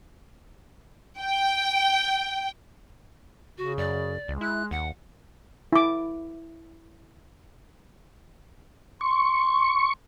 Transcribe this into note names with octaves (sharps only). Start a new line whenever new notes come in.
G5
C#3 F#4
F#2 D5
C#2 G#3
E4 F#6
D#2 F#5
E4 D6
C6 C#6